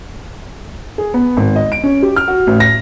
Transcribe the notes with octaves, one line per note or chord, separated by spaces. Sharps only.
G#4
B3
G#1
D#5
D7
C#4
G4
F6
F#4
A1
A#6